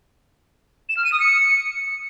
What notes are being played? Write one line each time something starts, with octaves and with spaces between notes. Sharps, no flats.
E7
F6
D#7
D#6
C#7